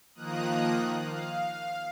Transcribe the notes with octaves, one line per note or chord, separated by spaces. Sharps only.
D#3 F3 A#3 A#5 D#6 F#6
F5